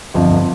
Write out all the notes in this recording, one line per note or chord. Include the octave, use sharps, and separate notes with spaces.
G1 F2 F3